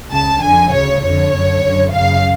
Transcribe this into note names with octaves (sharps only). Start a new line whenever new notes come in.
C#2 C#3 A5
F2 D3 G#5
D2 C#3 C#5
F2 D3 C#5
F#2 D3
F#2 D3
F#2 C#3 F5